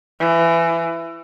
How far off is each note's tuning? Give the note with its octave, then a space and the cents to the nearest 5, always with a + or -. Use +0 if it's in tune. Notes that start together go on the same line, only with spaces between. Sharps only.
E3 +20